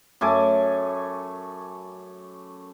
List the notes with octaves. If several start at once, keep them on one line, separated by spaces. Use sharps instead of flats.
F#2 A3 G#5 D6